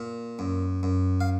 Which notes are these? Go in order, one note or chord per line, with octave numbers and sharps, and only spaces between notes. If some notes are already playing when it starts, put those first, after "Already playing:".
Already playing: A#2
F#2
F#2
F5